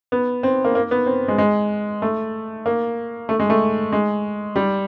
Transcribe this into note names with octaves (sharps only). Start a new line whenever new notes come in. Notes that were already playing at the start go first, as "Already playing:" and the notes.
B3
C4
A#3
A#3
B3
C4
G#3
G#3
A3
A#3
A3
G#3
A3
G#3
G3